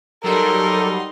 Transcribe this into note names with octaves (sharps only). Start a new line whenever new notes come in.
F#3 G3 D#4 A4 A#4 C6